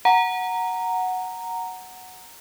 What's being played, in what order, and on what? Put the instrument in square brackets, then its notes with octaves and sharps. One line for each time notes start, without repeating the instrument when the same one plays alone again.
[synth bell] F#5 A#5